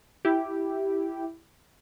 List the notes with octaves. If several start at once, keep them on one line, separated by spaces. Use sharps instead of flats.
E4 G4